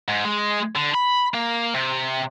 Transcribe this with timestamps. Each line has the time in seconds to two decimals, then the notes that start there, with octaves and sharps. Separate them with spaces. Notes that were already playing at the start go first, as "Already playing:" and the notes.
0.08 G#2
0.25 G#3
0.76 D3
0.94 B5
1.34 A#3
1.74 C3